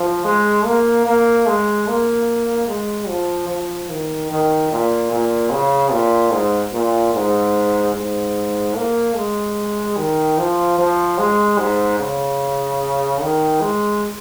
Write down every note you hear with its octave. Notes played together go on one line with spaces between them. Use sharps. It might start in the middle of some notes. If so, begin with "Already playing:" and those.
Already playing: F3
G#3
A#3
A#3
G#3
A#3
G#3
F3
F3
D#3
D#3
A#2
A#2
C#3
A#2
G#2
A#2
G#2
G#2
A#3
G#3
D#3
F3
F3
G#3
G#2
C#3
D#3
G#3